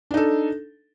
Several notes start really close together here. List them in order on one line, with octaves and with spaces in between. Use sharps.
D4 D#4 A4